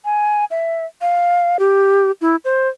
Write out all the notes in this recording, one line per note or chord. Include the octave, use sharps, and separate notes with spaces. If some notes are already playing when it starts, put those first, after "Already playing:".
G#5
E5
F5
G4
E4
C5